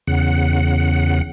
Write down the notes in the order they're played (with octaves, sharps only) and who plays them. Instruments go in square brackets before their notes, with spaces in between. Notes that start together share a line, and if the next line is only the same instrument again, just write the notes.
[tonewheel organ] E2 C#3 F#5